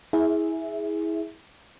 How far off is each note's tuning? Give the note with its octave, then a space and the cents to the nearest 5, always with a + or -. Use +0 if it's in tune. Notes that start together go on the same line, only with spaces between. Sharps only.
E4 -25 G#4 +0 E5 +0